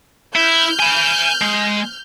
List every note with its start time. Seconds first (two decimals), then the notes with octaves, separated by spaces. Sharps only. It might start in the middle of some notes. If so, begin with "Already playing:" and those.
0.35 E4 F6 G6
0.80 G#5 B5
1.42 G#3